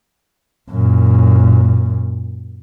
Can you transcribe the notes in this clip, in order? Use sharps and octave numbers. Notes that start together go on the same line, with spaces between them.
F#2 A#2